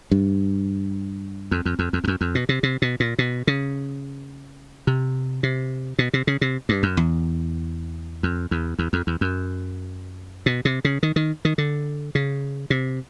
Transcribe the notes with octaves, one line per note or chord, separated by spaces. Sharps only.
G2
F2
F2
F2
F2
F2
F#2
F2
B2
C3
C3
B2
A#2
B2
C#3
C3
C3
B2
C3
C#3
C3
G2
F#2
E2
F2
E2
E2
F2
E2
F#2
B2
C3
C#3
D#3
D#3
D#3
D3
C#3
C3